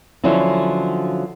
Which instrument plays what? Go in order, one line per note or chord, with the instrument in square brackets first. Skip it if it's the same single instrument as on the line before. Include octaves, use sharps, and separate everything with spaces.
[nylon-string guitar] D3 F3 F#3 C#4 E4